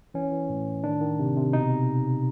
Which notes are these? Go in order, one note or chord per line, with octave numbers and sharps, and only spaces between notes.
E3 C#4
E3
A2
A2
D#3 D4
D#3
C3
C3
B2 D#4